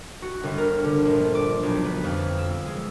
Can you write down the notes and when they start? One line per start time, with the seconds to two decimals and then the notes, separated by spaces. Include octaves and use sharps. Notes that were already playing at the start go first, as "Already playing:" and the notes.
0.22 F#4
0.43 G1
0.58 A#4
0.84 D3
1.05 A#1
1.35 D6
1.63 B1
1.85 B4
2.04 F2
2.38 E6
2.66 G#3